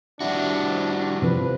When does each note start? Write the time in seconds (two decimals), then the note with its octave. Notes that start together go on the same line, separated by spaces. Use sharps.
0.21 G3 C4 D4 E4 F#4
1.22 C3 F3 C4 B4